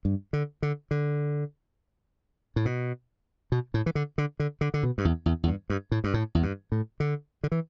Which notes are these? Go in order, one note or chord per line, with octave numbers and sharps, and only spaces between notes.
G2
D3
D3
D3
A2
B2
B2
A2
E3
D3
D3
D3
D3
D3
B2
G2
E2
E2
E2
G2
G2
A2
G2
A2
E2
G2
A2
D3
D3
E3